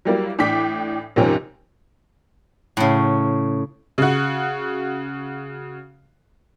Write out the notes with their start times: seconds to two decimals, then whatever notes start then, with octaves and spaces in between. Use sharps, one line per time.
0.05 F#3 G3 A#3 E4
0.39 A2 E3 D4 G5 D6 B6
1.16 D#2 G#2 C3 F3 C4 C#4
2.77 A2 C#3
3.98 C#3 F#4